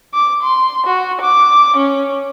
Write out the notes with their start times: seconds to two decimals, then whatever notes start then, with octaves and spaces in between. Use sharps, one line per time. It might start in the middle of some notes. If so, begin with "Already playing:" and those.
0.13 D6
0.42 C6
0.86 F#4
1.20 D6
1.76 C#4